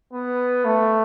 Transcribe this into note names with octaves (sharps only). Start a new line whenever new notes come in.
B3
A3